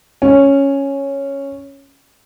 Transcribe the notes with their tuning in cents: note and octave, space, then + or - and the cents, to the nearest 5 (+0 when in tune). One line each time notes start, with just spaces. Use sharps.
C#4 -5